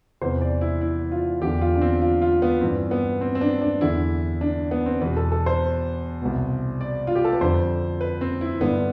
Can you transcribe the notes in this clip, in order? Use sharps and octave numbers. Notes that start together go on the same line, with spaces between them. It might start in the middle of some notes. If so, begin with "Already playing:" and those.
E2 C3 E3 C5
D5
E4
E4
F4
E2 D3 G4
F4
D4
C4
F4
F4
B3
G2 E3 C4
B3
C4
C4
D4
D4
E2 D3 E4
D4
B3
C4
E2 B2 B4
A4
A4
C5
C2 B2
D5
F4
G4
A4
B4
F2 D3 C5
B4
C4
E4
G2 D3 B3